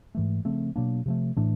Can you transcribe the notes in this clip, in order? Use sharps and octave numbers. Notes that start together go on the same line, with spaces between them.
G#2 E3 A3
C#3 F3 A3 C4
B2 F#3 A#3 D4
C3 F3 A3
A2 E3 A3 D4